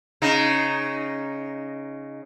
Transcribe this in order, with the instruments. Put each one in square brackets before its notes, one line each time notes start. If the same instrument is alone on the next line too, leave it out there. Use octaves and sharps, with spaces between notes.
[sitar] C#3 D#4